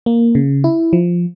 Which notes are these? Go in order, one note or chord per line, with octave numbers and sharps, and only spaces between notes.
A#3
C#3
E4
F3